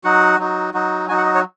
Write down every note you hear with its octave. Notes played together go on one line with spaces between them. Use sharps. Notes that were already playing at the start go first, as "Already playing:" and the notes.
F#3 D#4 F#4 F#5
F#3 D#4 F#4
F#3 D#4 F#4
F#3 D#4 F#4 G#5
F#5
D#5
C#5